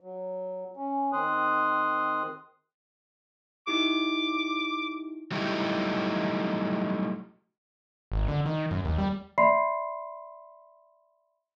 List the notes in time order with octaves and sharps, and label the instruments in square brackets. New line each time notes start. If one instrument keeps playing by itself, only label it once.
[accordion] F#3
C#4
D#3 C4 C6 D#6 F#6
[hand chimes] D#4 E4 G4 [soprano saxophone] D6
[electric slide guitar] F#3 G3 A3 D#4 E4 G4
[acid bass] G#1
D3
D#3
F#2
D#2
G3
[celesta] D5 E5 B5 C6 C7